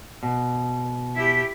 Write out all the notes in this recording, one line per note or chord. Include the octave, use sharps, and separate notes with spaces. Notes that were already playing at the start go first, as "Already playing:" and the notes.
B2
E4 G4